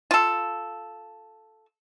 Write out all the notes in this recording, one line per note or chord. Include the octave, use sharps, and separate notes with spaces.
F4 A4